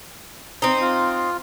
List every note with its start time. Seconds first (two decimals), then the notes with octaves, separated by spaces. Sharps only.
0.62 C4 D#4
0.81 F4